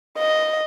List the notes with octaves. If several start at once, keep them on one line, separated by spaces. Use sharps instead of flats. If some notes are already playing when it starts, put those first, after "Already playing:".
D#5